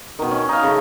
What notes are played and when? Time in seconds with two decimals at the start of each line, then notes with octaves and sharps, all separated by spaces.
0.19 B2 D#3
0.31 C#4
0.49 D#4 F5
0.63 C#3 A3